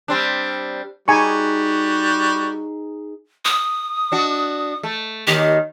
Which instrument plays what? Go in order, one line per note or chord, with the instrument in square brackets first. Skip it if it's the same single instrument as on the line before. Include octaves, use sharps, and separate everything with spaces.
[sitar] G3 C4 D4
[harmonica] G3 F#4 [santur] D#4 G#4 [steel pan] G#5 C#6
[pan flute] D#6
[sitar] D4 F#4
A3
[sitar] D#2 D#3 [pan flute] G4